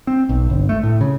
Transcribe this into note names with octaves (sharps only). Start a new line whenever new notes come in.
C4
B1
G1
A3
A2
C#3